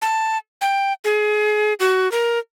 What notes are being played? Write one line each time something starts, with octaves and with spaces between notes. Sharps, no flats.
A5
G5
G#4
F#4
A#4